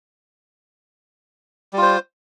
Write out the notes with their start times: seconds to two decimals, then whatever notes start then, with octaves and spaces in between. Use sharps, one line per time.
1.73 G3
1.78 F4
1.82 C5